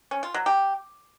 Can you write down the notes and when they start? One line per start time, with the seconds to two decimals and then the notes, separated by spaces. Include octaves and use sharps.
0.11 C#4
0.23 F4
0.34 F#3
0.46 G4